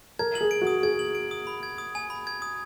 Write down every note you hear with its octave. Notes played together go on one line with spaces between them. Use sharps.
A#4 G#6
F#7
G#4
D7
F#4
D#6
G#4 G#6
F#7
D7
D#6
B5
G#6
D#6
G#5
B5
G#6
D#6